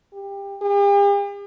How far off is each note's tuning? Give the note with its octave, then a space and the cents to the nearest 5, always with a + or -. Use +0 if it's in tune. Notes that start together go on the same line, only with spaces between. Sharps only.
G4 +20
G4 +45